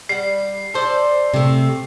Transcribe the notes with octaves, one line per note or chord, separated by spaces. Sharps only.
G3 F#5 C7
A4 C5 D5
C3 A3